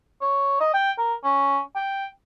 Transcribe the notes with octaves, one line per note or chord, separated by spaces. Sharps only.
C#5
D#5
G5
A#4
C#4
G5